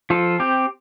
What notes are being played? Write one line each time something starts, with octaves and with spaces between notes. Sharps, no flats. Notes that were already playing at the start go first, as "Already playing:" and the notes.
F3 F4 A4
C4 G4